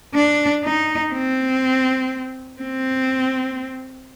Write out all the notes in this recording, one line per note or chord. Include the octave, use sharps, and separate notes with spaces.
D4
D#4
C4
C4